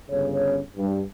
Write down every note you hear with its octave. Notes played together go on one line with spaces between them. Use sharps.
G1 C#3 C#4 C#5
G2